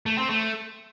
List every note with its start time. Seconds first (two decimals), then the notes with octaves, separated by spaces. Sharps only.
0.06 A3
0.18 C4
0.30 A3